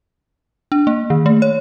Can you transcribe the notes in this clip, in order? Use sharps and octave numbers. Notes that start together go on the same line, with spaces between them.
D4
A#3
D#3
A3
C#5